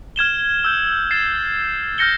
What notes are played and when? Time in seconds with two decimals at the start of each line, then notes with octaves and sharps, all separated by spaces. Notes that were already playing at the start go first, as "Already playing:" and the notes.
0.16 F6 G#6 E7 G7
0.64 E6 G6
1.11 A6 C7 E7
1.98 F6 G6 A#6 C#7 G7